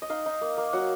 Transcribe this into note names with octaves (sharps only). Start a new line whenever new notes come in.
D#5
D#4 F5
D#4
A#3
A#3
F#3 F#5